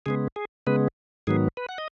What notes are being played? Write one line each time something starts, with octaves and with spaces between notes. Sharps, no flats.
C#3 G#3 B3 G#4
G#4
C#3 G#3 B3 B4
G#2 D#3 F#3 B3 G#4
B4
F#5
D#5